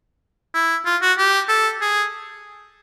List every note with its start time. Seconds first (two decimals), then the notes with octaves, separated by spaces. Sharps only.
0.54 E4
0.85 F4
1.01 F#4
1.18 G4
1.48 A4
1.81 G#4